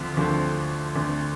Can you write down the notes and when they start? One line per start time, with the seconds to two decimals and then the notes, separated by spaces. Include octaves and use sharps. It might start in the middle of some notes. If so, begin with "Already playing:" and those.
Already playing: D2 D3 F3 C4
0.17 D2 D3 F3 C4
0.96 D2 D3 A3 C4